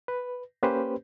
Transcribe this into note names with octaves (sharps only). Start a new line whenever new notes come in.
B4
A#3 C#4 G4 B4 C5